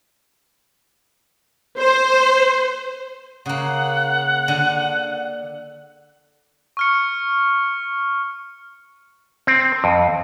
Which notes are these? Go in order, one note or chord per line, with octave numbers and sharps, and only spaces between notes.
C5
C#3 A#3 F#5
D3
C#6 F6 C#7
C4
F2